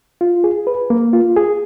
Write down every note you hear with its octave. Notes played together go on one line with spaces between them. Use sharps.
F4
G#4
B4
A#3
F4
G#4